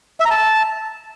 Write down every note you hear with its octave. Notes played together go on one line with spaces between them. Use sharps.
E5
A#5
A5